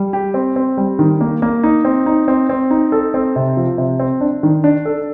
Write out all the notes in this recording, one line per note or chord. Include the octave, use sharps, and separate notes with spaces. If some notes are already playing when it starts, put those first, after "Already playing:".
Already playing: G3
G4
C4
C4
G3
D#3
A#3
A#3
D#4
C4
D#4
C4
C4
D#4
A4
C4
C3
F3
C3
C4
D4
D#3
D4
A4